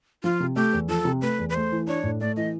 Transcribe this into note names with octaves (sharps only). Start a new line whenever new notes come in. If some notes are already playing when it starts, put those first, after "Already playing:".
F3 F4
C3
A3 G4
E2
F3 A4
C3
A3 B4
E2
B4
A3 C5
E3
D4 C#5
A2
A3 D5
E3 D#5